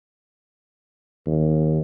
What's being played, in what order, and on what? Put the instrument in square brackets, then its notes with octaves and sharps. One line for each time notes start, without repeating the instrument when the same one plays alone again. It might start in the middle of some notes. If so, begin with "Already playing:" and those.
[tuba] D#2